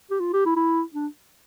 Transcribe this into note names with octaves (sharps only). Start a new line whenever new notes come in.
G4
F4
G4
E4
E4
D4